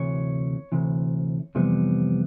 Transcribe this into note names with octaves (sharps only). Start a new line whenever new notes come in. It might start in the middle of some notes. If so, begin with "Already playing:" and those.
Already playing: D2 C3 E3 C#5
D2 C3 E3
F2 C3 E3 G3 B3